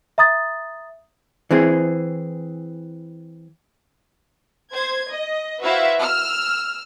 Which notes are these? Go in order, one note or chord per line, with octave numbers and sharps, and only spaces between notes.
E5 A#5 D#6 A6
E3 C4 G#4
C5 G#6
D#5
E4 F#4 B4 C5 E5 F5
E6 F6